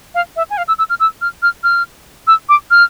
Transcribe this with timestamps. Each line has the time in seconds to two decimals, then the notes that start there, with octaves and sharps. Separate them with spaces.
0.14 F5
0.36 E5
0.50 G#5
0.57 F5
0.68 E6
0.78 E6
0.89 F6
1.00 E6
1.21 F6
1.42 F6
1.63 F6
2.27 E6
2.49 D6
2.71 F6